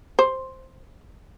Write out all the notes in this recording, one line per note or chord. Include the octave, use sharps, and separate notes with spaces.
C5